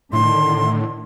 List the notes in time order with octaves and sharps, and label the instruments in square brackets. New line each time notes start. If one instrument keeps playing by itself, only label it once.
[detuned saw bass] A2 [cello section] D3 D#3 [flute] C6